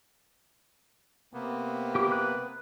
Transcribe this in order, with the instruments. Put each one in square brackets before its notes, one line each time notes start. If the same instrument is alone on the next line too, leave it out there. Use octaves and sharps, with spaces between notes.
[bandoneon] C3 A#3 B3
[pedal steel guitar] G4 D6
B4 F#6